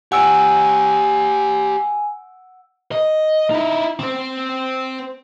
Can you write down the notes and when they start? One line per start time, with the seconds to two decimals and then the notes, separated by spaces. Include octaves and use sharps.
0.12 G4 C#5 F#5 G#5 E6 D7
2.92 D#5
3.50 D#4 E4
3.99 C4 C5